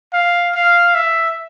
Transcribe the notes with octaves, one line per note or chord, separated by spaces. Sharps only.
F5
F5
E5